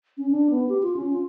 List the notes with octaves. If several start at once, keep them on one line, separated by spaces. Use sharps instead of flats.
C#4
D4
B3
G4
F4
C#4
F4